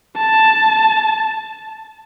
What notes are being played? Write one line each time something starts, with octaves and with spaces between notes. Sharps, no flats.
A5